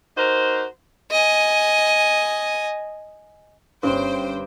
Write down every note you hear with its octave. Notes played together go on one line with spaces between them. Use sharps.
D#4 F#4 A#4 C5
D#5 G#5
G1 G2 C#4 C5 G5